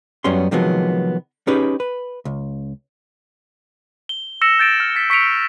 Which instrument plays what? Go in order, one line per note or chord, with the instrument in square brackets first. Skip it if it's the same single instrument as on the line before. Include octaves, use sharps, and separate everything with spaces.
[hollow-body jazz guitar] F#2 F#3 G3 B3 C#4 C6
C3 D#3 F3 F#3 G#3 B3
C#4 D#4 G4 G#4 B4
B4
C#2
[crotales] G7
E6 A#6 C#7 E7
G6 A6 D7 E7
F6
A6 B6
C#6 B6 C#7 D7 F7